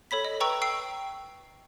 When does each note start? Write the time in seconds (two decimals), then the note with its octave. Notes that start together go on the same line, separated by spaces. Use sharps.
0.11 A4 C#5 B5 B6
0.25 D#5
0.40 B4 G5 A#5 C#6 E6
0.62 G5 E6 C7